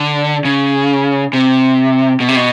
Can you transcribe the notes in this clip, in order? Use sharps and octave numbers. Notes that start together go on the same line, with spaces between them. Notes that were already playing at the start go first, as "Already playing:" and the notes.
Already playing: D3
C#3
C3
B2
C3
B2